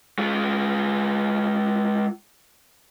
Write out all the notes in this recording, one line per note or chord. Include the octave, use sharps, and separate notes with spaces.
G#3 F4